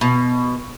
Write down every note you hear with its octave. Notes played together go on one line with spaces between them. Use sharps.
B2